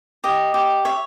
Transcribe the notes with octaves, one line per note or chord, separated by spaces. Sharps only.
G4 D#5
G4
C#5 E5